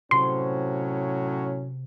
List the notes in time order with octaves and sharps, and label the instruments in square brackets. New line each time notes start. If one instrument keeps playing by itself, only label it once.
[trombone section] A2 F#3 C#4 [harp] C3 [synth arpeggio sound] C6